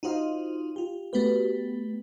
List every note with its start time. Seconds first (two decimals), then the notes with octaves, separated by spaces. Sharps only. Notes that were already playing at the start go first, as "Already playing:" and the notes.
0.03 D#4 F4 F#4 C5 D#5 F5
0.76 F4 G4
1.13 A3 B3 F#4 G4 B4